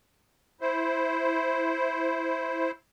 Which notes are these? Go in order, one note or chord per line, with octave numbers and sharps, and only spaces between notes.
E4 C5